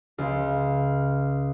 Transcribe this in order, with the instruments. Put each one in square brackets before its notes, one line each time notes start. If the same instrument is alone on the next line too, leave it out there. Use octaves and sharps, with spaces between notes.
[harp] C#2